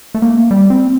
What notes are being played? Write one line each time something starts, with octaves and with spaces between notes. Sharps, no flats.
A3
A#3
G3
C4